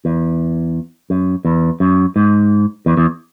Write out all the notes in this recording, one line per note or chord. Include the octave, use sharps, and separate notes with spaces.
E2
F#2
E2
F#2
G#2
E2
E2